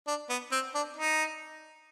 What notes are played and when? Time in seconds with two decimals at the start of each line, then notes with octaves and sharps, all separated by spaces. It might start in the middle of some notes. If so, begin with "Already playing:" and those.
0.07 D4
0.30 B3
0.52 C4
0.75 D4
0.97 D#4